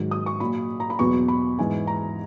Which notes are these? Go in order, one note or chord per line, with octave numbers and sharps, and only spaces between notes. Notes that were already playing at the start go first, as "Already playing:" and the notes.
Already playing: G#2 D#3 F#3
D#6
C#6
A#2 F#3 B5
A#5
B5
E2 B2 F#3 C#6
B5
G#2 E3 G#5
A#5